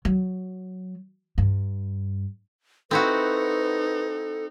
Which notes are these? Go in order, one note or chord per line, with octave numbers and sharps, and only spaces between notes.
F#3
G2
C4 D#4 E4 F#4 A4 B4